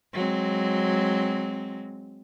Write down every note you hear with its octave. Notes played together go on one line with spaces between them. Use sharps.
F#3 G#3 C4